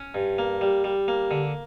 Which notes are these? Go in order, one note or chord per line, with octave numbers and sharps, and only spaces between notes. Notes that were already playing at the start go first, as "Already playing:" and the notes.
Already playing: C#4
G2
A#3
G3
G3
A#3
D3